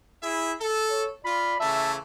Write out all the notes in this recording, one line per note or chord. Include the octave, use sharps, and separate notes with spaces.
E4 G#4 E5
A4
C#5
F4 D5 B5
C#3 E3 A3 E5 A5